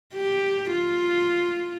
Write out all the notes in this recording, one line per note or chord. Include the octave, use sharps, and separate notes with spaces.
G4
F4